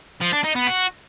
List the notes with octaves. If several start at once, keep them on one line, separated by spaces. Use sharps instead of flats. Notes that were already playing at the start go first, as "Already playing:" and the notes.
F3
D4
D#4
B3
F#4